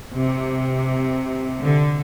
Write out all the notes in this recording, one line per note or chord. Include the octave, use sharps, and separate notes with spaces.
C3
D3